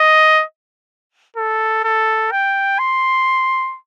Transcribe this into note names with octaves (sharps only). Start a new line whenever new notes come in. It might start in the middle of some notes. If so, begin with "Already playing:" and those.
Already playing: D#5
A4
A4
G5
C6